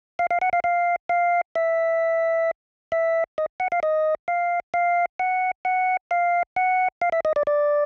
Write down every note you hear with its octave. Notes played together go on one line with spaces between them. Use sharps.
F5
F5
F#5
F5
F5
F5
E5
E5
D#5
F#5
F5
D#5
F5
F5
F#5
F#5
F5
F#5
F5
E5
D#5
D5
D5